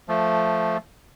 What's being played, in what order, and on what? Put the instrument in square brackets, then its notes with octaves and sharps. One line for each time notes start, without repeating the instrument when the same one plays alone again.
[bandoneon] F3 A3